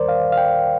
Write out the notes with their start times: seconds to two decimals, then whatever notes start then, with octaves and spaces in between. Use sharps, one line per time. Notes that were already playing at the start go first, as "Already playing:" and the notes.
Already playing: D#2 D#3 G3 A#4 C5 D5
0.08 F5
0.32 F5
0.37 G5